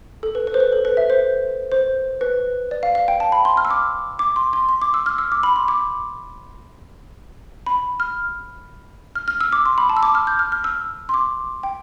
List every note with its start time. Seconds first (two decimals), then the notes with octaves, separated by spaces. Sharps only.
0.23 A4
0.35 B4
0.47 B4
0.54 C5
0.60 B4
0.72 A4
0.85 B4
0.97 E5
1.10 C5
1.72 C5
2.21 B4
2.71 D5
2.83 F5
2.95 F5
3.08 G5
3.20 A5
3.32 B5
3.45 C6
3.57 F6
3.65 E6
3.71 D6
4.19 D6
4.36 C6
4.53 C6
4.69 C6
4.82 D6
4.94 E6
5.06 F6
5.18 E6
5.32 D6
5.43 B5
5.56 C6
5.68 D6
7.66 B5
8.00 F6
9.15 F6
9.28 F6
9.41 E6
9.53 D6
9.66 C6
9.78 B5
9.90 A5
9.97 E6
10.03 D6
10.15 F6
10.27 G6
10.39 F6
10.52 F6
10.64 E6
11.09 C6
11.14 D6
11.63 G5